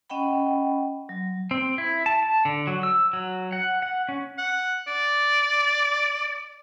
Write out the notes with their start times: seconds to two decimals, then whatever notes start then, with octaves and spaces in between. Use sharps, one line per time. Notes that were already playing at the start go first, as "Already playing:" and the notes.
0.10 C#4 D#5 F#5 G5 B5
1.09 F#3
1.51 C4
1.78 E4
2.06 A5
2.23 A5
2.45 D3
2.67 F#3
2.83 E6
3.13 F#3
3.52 F#5
3.82 F#5
4.09 C#4
4.38 F#5
4.87 D5